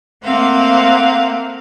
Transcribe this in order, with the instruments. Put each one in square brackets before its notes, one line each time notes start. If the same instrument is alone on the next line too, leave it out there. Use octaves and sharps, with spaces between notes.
[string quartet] A3 A#3 C4 F5 F#5